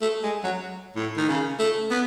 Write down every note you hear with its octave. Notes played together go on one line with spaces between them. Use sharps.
A3
G#3
F#3
A2
D#3
C#3
A3
B3